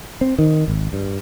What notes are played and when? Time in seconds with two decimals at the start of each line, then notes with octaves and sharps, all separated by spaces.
0.21 C4
0.39 D#3
0.68 G#1
0.93 G2